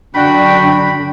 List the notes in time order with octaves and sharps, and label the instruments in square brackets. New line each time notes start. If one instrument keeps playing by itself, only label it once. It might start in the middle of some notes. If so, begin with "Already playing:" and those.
[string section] F#2 D3 [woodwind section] D4 F#4 [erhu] G5 [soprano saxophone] B5